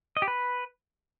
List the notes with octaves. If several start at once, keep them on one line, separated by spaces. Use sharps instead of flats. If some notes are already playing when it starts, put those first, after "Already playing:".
D#5
G4
B4